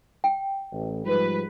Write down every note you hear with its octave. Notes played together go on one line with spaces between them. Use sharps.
G5
A1
G#2 F3 G3 B4